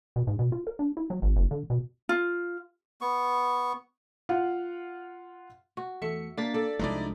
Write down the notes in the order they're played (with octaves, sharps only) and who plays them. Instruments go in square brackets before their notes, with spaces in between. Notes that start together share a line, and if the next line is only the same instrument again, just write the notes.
[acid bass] B2
G#2
B2
F4
A#4
D4
E4
F#3
G#1
F#1
D3
B2
[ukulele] F4
[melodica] B3 C#6
[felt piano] F4 F5 F#5
[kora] F#4
[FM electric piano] E2 A3 C#7 [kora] E5
[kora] A#3 [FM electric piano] D4 A6 B6
[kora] A4 [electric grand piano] D5
[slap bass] C2 F3 G#3 [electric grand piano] D#4 E4 D5